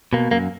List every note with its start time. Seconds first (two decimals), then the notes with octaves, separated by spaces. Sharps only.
0.13 B2 A#3
0.31 F#2 A#3